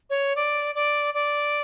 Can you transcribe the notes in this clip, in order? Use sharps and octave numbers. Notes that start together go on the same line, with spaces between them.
C#5
D5
D5
D5